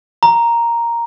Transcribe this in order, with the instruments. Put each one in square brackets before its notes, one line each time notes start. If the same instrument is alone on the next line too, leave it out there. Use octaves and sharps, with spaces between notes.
[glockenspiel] A#5